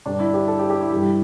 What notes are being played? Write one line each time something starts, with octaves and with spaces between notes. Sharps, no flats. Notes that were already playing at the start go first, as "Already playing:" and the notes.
G2 D3 G3 D4
E4
G4
A4
G4
G4
E4
G2 E3 G3